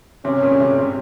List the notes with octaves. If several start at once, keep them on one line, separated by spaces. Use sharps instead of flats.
C3 C#4
A#2
C#3
C3
C3